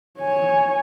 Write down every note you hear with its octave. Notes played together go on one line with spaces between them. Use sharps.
C#5 G#5